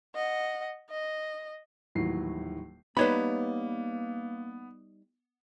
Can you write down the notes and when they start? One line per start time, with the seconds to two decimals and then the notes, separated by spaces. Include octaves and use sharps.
0.15 D#5 F#5
0.90 D#5
1.95 D#1 A2 D#3 E3 F#3 C7
2.97 G3 A#3 B3 D#4 G4 B4 C#5 B5